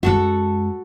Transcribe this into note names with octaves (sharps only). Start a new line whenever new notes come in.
F#2 G#3 F#4 A4 F#5